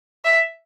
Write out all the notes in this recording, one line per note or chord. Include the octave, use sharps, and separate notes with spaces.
E5